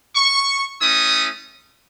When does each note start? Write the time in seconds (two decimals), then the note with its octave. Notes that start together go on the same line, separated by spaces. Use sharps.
0.16 C#6
0.82 A3 C#4 E4 D#6